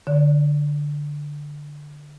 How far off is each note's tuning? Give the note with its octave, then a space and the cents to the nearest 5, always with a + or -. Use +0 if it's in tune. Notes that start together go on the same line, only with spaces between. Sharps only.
D3 +0 D5 -40